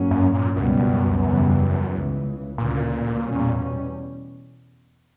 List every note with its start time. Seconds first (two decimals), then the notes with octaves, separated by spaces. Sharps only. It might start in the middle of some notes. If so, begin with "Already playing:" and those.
Already playing: G2 F#3 A#3 C#4
0.11 F#2
0.34 A#2
0.56 C#2 F#2 B2 G3 B3
1.23 E2 C#3 E3 G3 B3
1.91 C#2 C#3 E3
2.58 D2 A#2 C#3 E3 A#3
3.26 E2 B2 G3 C#4